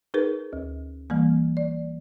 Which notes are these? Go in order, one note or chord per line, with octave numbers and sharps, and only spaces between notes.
D#4 G#4 A#4 B4
D2
E3 G3 A#3
D5